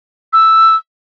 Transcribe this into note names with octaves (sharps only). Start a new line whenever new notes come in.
E6